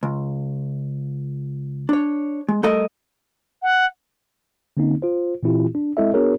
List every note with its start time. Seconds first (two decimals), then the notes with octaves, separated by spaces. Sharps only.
0.03 C#2
1.89 D4 C#5
2.49 G#3
2.63 G3 A3 A4 A#4 D#5 E5
3.62 F#5
4.77 D3 A#3 C4 C#4 D#4
5.02 F4 C5
5.43 A#2 E3 C4 E4 F4 G4
5.75 D4
5.97 G#3 C4 E4 A4 D#5 E5
6.14 B3 D4 F#4 G#4 A#4 C#5